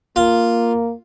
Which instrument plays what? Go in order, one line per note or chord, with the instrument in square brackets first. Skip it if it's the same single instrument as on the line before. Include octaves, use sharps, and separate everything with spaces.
[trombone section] A#3 [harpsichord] F4